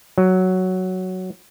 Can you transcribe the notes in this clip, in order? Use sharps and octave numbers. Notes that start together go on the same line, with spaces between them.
F#3